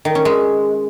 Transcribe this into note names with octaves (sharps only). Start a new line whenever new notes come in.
D#3
C#4
G#3